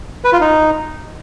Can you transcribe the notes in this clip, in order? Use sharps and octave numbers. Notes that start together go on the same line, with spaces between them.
B4
F4
D#4